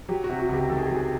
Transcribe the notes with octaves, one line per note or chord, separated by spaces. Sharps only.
F#3 G4
F#4
C3
F#4
C#2 G4
D#3 A4
G#4
F#3 G4
G#4